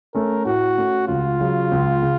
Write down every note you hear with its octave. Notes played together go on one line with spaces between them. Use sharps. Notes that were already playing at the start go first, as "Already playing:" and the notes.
A3 C#4 A#4
A2 F#4
A3 C#4
C#2 F4
C#3 F#3
C#2
C#3